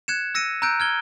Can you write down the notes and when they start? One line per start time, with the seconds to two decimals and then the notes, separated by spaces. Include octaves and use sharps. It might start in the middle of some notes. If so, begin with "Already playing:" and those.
0.08 F#6 G#6 C#7 E7
0.35 E6 A#6 C#7 D#7
0.62 A#5 E6 F#6 G6 D7
0.80 F6 G#6 G7